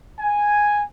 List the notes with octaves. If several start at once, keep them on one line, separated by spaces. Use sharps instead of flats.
G#5